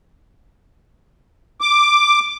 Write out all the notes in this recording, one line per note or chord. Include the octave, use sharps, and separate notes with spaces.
D6